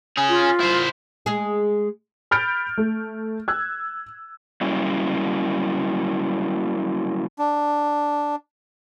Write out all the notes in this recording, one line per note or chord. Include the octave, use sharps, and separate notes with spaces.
C#4 G#4
F4
E4 C5
G#3 G#4
B5 F6 G6 A6 D7
A3
E6 F#6 G#6
F#3 G3 A#3 C#4 E4
D4